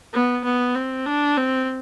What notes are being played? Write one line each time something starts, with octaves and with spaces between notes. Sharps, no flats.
B3
B3
C4
D4
C4